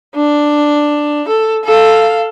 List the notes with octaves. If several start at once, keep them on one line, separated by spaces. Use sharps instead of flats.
D4
A4
A4 F5